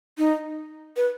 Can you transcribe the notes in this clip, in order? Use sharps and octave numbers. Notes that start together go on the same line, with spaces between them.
D#4
B4